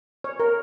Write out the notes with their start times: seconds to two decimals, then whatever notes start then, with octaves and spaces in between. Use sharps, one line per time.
0.24 C#5
0.40 A#4